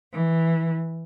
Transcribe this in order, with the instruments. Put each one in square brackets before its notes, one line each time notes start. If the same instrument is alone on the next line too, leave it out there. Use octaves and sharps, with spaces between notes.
[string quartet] E3